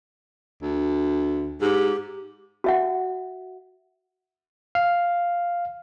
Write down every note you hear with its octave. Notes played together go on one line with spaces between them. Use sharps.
D2
G#2 G4
F#4 E5 F#5
F5